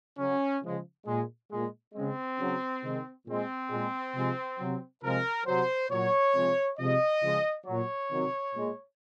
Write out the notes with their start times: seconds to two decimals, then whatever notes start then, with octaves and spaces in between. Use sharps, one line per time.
0.18 C#3 F#3 C#4
0.63 C#3 F3 G#3
1.06 A#2 G#3
1.51 A#2 G#3
1.94 C#3 G#3 C4
2.38 C#3 F#3
2.82 C3 D#3 G#3
3.26 A#2 G#3 C4
3.70 A#2 G#3
4.15 C3 F3 G#3
4.58 C3 F#3
5.02 C3 F3 G#3 A#4
5.46 C3 F#3 C5
5.91 A#2 F#3 C#5
6.34 C3 F3 G#3
6.78 C3 F3 G#3 D#5
7.22 C#3 F3 G#3
7.66 A#2 F#3 C#5
8.10 C3 D#3 F#3
8.55 A#2 G#3